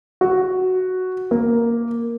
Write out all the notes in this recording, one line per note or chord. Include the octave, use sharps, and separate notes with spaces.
F#4
A#3